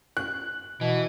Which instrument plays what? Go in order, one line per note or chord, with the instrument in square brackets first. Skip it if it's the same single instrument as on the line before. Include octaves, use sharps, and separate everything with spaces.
[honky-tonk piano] F#6
[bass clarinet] B2 [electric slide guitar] E3